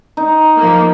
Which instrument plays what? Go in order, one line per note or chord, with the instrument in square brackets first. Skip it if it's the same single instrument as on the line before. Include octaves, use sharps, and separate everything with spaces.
[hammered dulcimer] D#4
[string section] F3 A#3